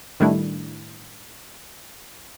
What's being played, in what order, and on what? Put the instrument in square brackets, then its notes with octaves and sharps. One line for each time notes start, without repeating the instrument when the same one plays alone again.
[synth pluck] A2 D#3 G3 A3 D4 E4